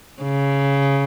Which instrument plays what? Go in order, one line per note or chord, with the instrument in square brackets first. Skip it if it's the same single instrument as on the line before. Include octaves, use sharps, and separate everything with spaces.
[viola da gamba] C#3